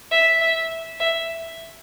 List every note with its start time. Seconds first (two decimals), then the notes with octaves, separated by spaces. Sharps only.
0.12 E5
0.42 E5
1.00 E5